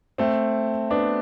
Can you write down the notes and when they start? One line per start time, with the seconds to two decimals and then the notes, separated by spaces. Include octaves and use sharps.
0.18 A3 C4
0.90 B3 D4